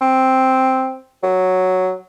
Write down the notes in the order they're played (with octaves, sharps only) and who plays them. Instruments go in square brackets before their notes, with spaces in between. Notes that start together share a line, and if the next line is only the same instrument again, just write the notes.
[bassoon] C4
F#3